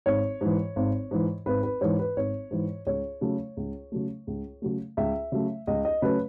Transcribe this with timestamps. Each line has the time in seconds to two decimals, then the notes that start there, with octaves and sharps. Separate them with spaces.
0.06 G#1 C#5
0.41 G#2 E3
0.76 G#1
1.11 G#2 E3
1.46 G#1 B4
1.63 B4
1.81 G#2 E3 C#5
1.99 B4
2.16 G#1 C#5
2.51 G#2 E3
2.86 C#2 C#5
3.21 C#3 F#3 A3
3.57 C#2
3.92 C#3 F#3 A3
4.27 C#2
4.62 C#3 F#3 A3
4.97 C#2 E5
5.32 C#3 F#3 A3
5.67 C#2 D#5
5.85 D#5
6.02 C#3 F#3 A3 C#4 B4